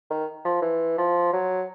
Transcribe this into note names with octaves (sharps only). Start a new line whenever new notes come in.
D#3
F3
E3
F3
F#3